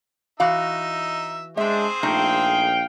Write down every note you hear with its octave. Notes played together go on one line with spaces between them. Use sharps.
E3 D#4 F#4 E5 F5
G#3 C4 D4 G#4 C5 E5 G5
A#1 A3 D#4 F5 G5